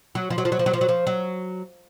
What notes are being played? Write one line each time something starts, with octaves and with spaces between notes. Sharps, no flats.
F#3
F3
F#3
F3
F#3
F3
F#3
F3
F#3
F3
F#3